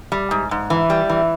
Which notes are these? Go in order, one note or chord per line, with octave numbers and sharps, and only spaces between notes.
G3
G#2
G#2
E3
G3
E3